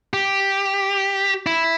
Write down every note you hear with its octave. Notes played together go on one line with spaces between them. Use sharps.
G4
E4